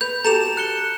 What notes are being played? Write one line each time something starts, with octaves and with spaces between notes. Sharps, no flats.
B4 G6 F7
F#4 G4 A4 A#5 E7 F7
F#6 C#7 G7